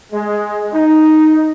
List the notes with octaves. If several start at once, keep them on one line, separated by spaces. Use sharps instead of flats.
G#3
D#4